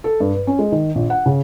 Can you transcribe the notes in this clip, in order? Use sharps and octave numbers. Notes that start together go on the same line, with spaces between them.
A4
G2
B4
C#4
G#3
D#3
A#1
F#5
C#3